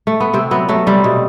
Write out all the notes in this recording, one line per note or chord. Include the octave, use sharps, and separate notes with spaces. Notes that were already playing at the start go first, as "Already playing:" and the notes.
A3
B3
C3 C4
F#3 B3
F#3 A3
C3 G3
B2